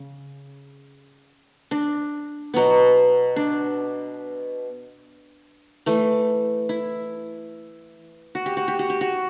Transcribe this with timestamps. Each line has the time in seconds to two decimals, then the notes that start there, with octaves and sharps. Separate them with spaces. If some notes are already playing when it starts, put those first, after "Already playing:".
Already playing: C#3
1.71 D4
2.54 B2 F#3 B3
3.36 D4
5.86 E3 A3
6.69 E4
8.35 F#4
8.46 G4
8.57 F#4
8.68 G4
8.79 F#4
8.90 G4
9.01 F#4